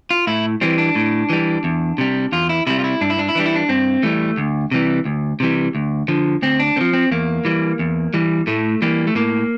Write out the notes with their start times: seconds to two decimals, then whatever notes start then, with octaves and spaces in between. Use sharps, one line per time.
0.10 F4
0.27 A2 E4
0.61 E3 G3 C4
0.78 D4
0.95 A2
1.30 E3 G3
1.64 E2
1.98 C3 G3
2.32 E2 F4
2.49 E4
2.67 C3 G3 E4
2.79 F4
2.84 E4
3.01 G2 D4
3.10 E4
3.19 D4
3.29 E4
3.35 E3 G3 D4
3.46 E4
3.56 D4
3.69 G2 C4
4.03 E3 G3 A3
4.37 D2
4.71 C3 E3 G3
5.05 D2
5.40 C3 E3 G3
5.75 D2
6.08 D3 F3
6.42 D2 C4
6.60 D4
6.76 D3 C4
6.81 F3
6.93 C4
7.11 E2 A#3
7.45 E3 G3
7.79 E2
8.14 E3 G3
8.47 A2 A3
8.82 E3 G3 A#3
9.07 A3
9.15 A2 A#3